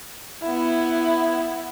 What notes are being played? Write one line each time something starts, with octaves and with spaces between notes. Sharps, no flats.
B3 E4